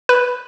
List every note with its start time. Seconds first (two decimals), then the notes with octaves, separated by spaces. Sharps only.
0.09 B4